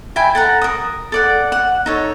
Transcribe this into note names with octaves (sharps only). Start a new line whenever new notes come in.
E5 G5 G#5 B5
A4 F#5 A#5
A#4 D#6
A4 D5 F#5
F#5
D#4 A4 C#5